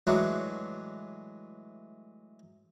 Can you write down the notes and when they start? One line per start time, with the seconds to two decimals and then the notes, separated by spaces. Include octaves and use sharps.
0.07 A2 E3 F#3 G#3 D4 F#4